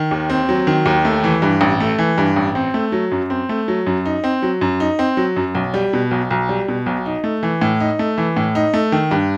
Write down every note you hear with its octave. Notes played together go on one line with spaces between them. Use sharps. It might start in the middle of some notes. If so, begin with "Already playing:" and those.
Already playing: D#3
D#2
C4
F#3
D#3
D#2
A3
E3
G2
A1
A3
E3
G2
A1
C4
A3
F#3
F#2
C4
A3
F#3
F#2
D#4
C4
F#3
F#2
D#4
C4
F#3
F#2
B1
G3
B2
B1
B1
G3
B2
B1
D#4
A3
E3
A2
D#4
A3
E3
A2
D#4
A3
D#3
G2